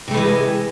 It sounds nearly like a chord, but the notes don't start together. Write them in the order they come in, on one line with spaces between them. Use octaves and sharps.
C3 A3 E3 G#3